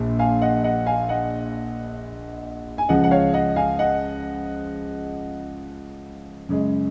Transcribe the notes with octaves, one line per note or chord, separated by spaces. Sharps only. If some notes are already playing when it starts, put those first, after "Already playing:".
Already playing: A#1 A#2
F5 G#5
D#5 F#5
D#5 F#5
F5 G#5
D#5 F#5
G#5
C#2 C#3 F3 D#5 F#5
F#5
C#5 F5
D#5 F#5
F5 G#5
D#5 F#5
F#2 C#3 G#3